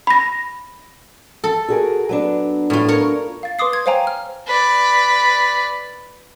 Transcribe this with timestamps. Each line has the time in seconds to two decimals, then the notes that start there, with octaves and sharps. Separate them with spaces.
0.07 B5 A#6
1.44 A4
1.68 F#4 G#4 A#4
2.09 F#3 B3 D4
2.70 A2 F4
2.88 A#4 C#5
3.43 F5 A6
3.59 B4 C6 D6 D#6 C7
3.73 G#6
3.86 C5 C#5 F5 G5 G#5 A#5
4.07 F6
4.47 B4 D5